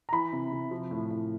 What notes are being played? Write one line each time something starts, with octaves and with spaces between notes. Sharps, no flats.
A#5
E3 B5
C3
C3
F3
A2
A2